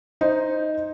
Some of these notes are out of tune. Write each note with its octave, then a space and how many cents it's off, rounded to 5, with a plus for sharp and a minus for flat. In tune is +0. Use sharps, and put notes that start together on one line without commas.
D#4 +0 C5 +0